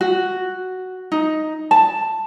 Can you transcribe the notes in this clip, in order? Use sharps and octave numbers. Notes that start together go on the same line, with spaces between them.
F#4
D#4
A5